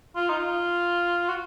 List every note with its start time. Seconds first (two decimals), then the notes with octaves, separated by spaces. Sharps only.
0.16 F4
0.29 D#4
0.39 F4
1.29 F#4